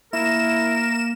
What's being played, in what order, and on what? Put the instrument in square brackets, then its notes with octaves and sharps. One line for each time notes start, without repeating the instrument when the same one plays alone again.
[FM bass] A#3 [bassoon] E4 [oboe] A#4 [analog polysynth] E7